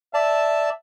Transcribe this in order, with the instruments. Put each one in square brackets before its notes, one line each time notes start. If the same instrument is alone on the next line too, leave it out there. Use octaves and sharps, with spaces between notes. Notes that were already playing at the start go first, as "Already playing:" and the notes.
[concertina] D5 A5 [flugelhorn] E5